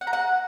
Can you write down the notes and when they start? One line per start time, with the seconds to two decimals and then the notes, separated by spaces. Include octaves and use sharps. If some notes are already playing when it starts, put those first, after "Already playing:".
0.01 F#5
0.07 A#5
0.13 F#5